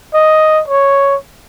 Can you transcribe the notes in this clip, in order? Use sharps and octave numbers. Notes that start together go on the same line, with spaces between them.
D#5
C#5